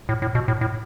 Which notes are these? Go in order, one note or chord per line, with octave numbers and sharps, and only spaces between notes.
A2
A2
B2
A2
A2